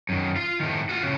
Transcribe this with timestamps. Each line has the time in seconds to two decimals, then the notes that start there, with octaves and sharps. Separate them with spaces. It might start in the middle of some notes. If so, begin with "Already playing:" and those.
0.09 F#2 D#3
0.36 F4 F5
0.60 A2 D#3
0.89 F4 F#4
1.03 A2 C#3